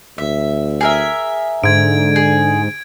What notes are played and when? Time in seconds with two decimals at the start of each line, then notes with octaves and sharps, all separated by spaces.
0.18 D2 E5
0.81 G#4 A#4 E5
1.64 G#2 D3 G#6 D7
2.16 G#4